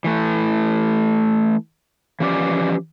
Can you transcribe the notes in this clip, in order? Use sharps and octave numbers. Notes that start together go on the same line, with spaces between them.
E3 A3
E3 F3 C#4 G4 D5